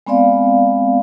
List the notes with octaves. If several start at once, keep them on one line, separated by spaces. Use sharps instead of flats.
G#3 B3 C4 D5 F5